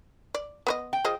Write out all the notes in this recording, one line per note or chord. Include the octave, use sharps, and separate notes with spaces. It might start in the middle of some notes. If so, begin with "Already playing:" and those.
D5
B3 B4 D#5
G5
F3 G#4 D#5